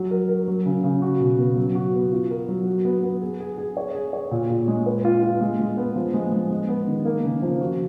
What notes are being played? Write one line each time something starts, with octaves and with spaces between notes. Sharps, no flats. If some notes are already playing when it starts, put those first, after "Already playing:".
Already playing: F#3
A#4
A#4
F#3
C#3
C#3
F#4
B2
B3
F#3
F#4
B3
F4
A#4
F#3
F#4
B3
B3
G#4
G#4
G#4
C#5
G#4
C#5
A#2
A#2
G#3
B4
F4
F4
G#3
G#3
B3
F3
G#3
G#3
G#3
B3
D#3
A#3
C#3
F3
F#4